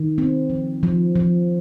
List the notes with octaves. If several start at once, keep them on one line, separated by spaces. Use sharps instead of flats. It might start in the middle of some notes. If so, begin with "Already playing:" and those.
Already playing: D#3
C4
F3
F3
F3